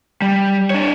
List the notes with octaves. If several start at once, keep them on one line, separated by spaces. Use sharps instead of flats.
G3
D4 C#5